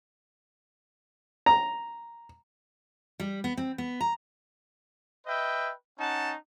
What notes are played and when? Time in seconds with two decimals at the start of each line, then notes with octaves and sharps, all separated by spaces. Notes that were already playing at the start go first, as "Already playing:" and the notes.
1.46 A#5
3.20 G3
3.44 B3
3.57 C4
3.78 B3
4.01 A#5
5.27 B4 D#5 E5 G5
5.99 C#4 D#4 F#5 A5